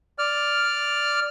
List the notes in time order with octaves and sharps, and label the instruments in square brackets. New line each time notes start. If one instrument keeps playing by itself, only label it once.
[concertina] D5 F6